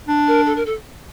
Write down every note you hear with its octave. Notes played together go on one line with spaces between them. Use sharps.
D4
A#4
A4
A#4
A4